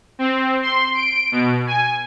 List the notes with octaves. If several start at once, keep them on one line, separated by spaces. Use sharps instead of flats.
C4
C6
D7
B2
G#5